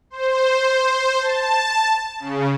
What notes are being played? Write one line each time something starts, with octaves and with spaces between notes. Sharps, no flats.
C5
A5
C#3